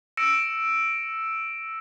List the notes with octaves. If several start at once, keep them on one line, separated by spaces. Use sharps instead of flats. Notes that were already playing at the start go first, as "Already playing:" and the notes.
E6 A#6 C#7 D7 E7